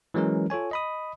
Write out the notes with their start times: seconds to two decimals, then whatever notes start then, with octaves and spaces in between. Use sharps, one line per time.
0.14 E3 F#3 G#3 C#4 A#4
0.50 F4 A4 C#5 G#5
0.71 D#5 B5 D#6